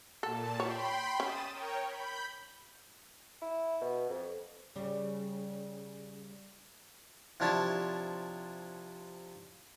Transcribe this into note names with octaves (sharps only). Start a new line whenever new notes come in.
A#2 A4 A5
C#5 G5 B5 C6
C#4 D#6 A6 E7
A#4 C#5 G5
B5 G6
E4
B2
F2
C#3 G3
C3 F3 D4 E4 C#5 A5